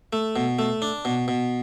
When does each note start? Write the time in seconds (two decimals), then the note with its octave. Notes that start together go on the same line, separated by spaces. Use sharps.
0.13 A3
0.36 B2
0.59 A3
0.82 D4
1.05 B2
1.28 B2